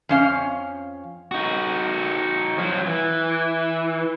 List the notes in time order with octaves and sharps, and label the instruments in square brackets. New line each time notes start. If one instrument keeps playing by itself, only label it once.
[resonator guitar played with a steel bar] F2 C#4 F5
[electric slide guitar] D#4 F#4
F3 F#3
E3